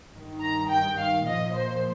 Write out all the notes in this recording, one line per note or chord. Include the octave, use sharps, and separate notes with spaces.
G2 D#3
A#5
G5
F5
A#2 F3 D#5
C5